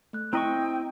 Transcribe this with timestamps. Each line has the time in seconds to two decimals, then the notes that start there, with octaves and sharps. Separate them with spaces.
0.13 A3 F#6
0.33 C4 E4 D#5 G5 A#5 C#6